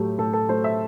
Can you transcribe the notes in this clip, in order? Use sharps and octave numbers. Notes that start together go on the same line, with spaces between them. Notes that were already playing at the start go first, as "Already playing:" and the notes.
Already playing: A2 F#3 A3 G4
A2 A4
A4
F#3 A3 C5
E5